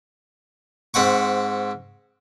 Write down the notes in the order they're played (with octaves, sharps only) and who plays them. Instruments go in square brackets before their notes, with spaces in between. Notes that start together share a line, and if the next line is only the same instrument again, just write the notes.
[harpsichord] G#2 C4 F#5 C#6